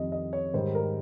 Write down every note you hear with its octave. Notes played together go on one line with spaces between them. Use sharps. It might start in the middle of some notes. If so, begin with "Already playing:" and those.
Already playing: F2 D#3 G3 D#5
D#5
C#5
G#2 D#3 G3 C5
A#4